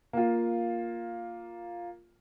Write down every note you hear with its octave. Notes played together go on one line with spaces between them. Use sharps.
A#3 F4